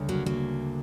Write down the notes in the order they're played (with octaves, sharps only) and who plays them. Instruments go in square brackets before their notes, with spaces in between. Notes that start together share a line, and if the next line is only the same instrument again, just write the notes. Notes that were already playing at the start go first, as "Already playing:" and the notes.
Already playing: [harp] D2 C#3 G3 B3
[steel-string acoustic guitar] F#3 A#3
F#3 A#3